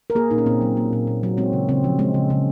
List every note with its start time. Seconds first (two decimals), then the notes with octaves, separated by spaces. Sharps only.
0.10 A#4
0.15 A#3 G#4
0.31 A#2 D#4
0.38 C#4
0.46 A#2 C4
0.62 F#3
0.77 A#3
0.93 A#2
1.07 A#2
1.23 F#3
1.37 G#3 C4
1.53 C#3
1.69 C#3 C4
1.84 F3
1.99 G#3 C4
2.14 C#3
2.30 C#3